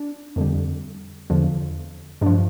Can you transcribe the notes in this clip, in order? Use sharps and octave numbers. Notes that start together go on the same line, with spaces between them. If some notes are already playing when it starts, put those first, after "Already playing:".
Already playing: D4
F2 D3 G3
E2 D3 F3
G2 F3 D4